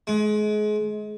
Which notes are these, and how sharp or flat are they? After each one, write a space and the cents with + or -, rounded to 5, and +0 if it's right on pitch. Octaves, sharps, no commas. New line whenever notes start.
G#3 +30